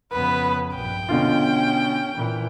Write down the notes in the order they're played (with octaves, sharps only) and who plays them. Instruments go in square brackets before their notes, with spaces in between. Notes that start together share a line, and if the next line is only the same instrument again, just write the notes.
[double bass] F2 C#3 [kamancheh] B3 B4
[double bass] A#1 G2 [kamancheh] G5
[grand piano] B2 D3 F4 [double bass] C#4
[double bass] A#2 E3